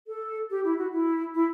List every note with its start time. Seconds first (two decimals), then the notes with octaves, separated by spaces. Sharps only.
0.07 A4
0.50 G4
0.64 E4
0.78 F#4
0.92 E4
1.34 E4